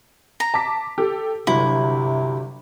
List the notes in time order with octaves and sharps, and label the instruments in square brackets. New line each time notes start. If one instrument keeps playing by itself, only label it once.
[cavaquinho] A#5
[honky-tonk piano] A5 D6 B6
G4 A4
[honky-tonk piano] G1 F#3 [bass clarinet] C3 [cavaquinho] E4